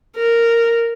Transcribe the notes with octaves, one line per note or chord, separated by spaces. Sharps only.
A#4